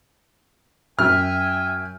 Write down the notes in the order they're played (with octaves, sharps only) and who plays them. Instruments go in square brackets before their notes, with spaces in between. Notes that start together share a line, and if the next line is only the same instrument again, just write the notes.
[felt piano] F#2 [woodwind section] E5 G5 G#5 [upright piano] F6